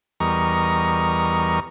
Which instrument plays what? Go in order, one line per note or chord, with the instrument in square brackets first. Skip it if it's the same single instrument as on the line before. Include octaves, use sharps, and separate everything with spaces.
[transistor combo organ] E2 G3 A#4 D#5 A#5 C#6